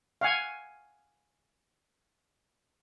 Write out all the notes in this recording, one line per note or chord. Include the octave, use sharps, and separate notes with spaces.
F5 F#5 G#5